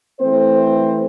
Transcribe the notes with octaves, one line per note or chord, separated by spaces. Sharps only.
E3 A3 C4 C5